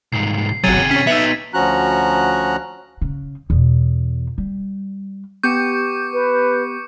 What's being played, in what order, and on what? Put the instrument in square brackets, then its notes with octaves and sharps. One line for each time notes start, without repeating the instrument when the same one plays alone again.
[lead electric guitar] C2 G#2 [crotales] C7
[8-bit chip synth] G1 F#3 [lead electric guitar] C3 G#4 [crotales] G#6 A6 D#7
[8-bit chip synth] C#4 [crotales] B6
[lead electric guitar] B3 D#4 [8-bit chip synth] E5
[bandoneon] D2 F3 C#4 F#4 A#5 F#6
[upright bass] C#3
E2 B2
G3
[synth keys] B3 G4 [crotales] C#6 D6 C#7 [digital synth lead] G6
[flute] B4